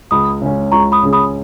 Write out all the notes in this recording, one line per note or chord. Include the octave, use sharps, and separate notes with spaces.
C#2 B5 D#6
C#3 G#3 C#4
C#2 A#5 C#6
B5 D#6
C#3 G#3 C#4
B5 D#6